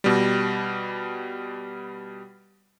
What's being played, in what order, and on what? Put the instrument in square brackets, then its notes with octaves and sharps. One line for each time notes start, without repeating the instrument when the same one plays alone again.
[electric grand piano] B2 G3